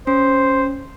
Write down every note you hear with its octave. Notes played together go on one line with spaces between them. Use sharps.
C#4 C5